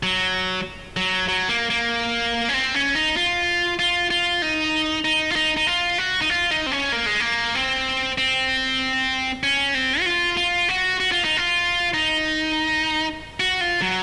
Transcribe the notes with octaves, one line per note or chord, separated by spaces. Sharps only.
F#3
F#3
F#3
A#3
A#3
C#4
C4
C#4
D#4
F4
F4
F4
D#4
D#4
F4
D#4
D#4
F4
F#4
D#4
F4
D#4
C4
C#4
A#3
G#3
A#3
C4
C4
C#4
C4
F#4
F4
F4
F#4
F#4
F4
D#4
F4
D#4
F#4
F4
F#3